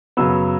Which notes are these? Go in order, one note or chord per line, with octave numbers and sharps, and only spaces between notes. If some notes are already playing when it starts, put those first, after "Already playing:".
F#2 C#3 F#3 B3 E6